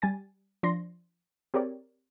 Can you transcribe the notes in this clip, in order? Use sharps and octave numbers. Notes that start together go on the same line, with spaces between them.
G3 G#5 A6
F3 D4 D5 C6 A#6
C4 G4 G#4 A#4 C#5 D5